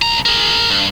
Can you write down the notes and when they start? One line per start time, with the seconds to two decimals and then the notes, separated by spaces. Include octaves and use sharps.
0.02 C2 A#5
0.26 G#4 A#4
0.70 G2